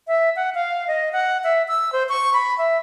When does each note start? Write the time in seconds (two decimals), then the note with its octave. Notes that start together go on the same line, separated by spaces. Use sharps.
0.08 E5
0.36 F#5
0.55 F5
0.88 D#5
1.13 F#5
1.44 E5
1.68 E6
1.93 C5
2.09 C#6
2.33 B5
2.58 E5